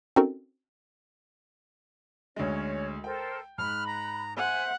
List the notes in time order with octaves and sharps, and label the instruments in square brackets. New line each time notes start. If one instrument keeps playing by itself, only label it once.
[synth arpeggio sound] C4 C#4 D#4 F#4 A4 A#4
[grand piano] D2 G#3 [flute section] C#4 C#5
[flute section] A4 A#4 C5 [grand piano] G5
[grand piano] G#2 [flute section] B5 F#6 [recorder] F6
[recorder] A#5
[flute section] C5 E5 [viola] F#5 [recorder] G#5